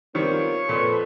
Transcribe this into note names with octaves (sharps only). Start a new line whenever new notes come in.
D#3 G3 B3 C4 F4 A#4 C#5
F2 A#2 A4 B4 C6